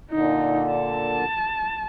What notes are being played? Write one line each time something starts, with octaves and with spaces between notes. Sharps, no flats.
A#2 D3 D#4
A5